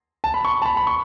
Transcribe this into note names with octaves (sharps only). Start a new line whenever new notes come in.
A5
B5
C#6
A5
B5
B5
C#6